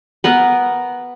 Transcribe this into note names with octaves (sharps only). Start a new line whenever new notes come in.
B3 A#4 B4